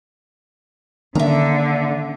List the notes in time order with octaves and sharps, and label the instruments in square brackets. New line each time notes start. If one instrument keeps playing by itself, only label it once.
[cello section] D3 [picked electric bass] D#3 A#3 C#4 [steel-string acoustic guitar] E5 A#5